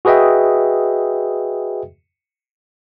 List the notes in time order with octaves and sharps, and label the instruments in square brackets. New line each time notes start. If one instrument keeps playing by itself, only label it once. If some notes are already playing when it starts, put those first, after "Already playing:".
[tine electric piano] F#4 G#4 B4 D#5 E5 G5